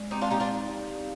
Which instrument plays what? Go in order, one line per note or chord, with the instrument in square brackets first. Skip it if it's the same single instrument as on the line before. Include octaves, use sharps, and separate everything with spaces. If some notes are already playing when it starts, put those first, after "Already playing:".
Already playing: [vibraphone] G#3 D5
[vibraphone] C4 [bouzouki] D#4 G4
[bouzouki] D4 F4
[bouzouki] D#4 G4 [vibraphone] D5
[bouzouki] D4 F4
[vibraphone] D#4
G4
F5